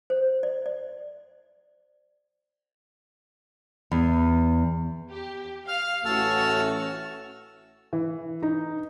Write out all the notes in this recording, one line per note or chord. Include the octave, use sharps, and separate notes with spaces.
C5
D5
D5
E2
G4
F5 F6
A1 A3 C#4 F#4 A5 E6 F6
E3
D#4